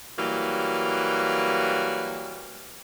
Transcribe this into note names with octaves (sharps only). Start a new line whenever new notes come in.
E3 F#3 G3 A#3